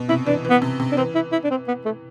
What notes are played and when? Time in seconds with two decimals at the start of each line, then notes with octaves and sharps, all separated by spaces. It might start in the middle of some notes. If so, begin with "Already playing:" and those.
Already playing: B2
0.09 C3 E4
0.26 E3 D4
0.45 E3
0.50 B3
0.62 C3
0.80 C3
0.92 D4
0.97 E3 C4
1.15 E4
1.32 E4
1.44 D4
1.50 C4
1.68 B3
1.85 A3